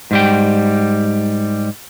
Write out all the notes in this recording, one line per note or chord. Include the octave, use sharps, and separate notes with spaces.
G#2 G3 G5